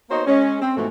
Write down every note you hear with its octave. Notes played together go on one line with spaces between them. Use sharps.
A#3 B3 D#4 F#4 C5 C#5
G#3 C#4
C4
G#2 B2 E3 F3 A3